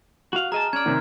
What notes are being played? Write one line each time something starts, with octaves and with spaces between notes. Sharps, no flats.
F#4 F5
G#4 D#5 A5 A#5 F6
C#4 D5 F6 G#6
C3 D#3